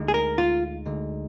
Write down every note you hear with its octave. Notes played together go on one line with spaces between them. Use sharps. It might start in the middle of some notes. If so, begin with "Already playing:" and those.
Already playing: D2 D3 G#3 D#4
G#4
A#4
F4
D2 D3 G#3 D#4